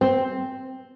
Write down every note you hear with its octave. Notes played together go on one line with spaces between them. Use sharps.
C4